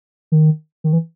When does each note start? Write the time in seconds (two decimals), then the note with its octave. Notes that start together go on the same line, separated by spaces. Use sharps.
0.32 D#3
0.84 D#3
0.93 E3